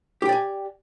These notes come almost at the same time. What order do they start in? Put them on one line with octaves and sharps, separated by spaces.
G4 G5 D5 G#5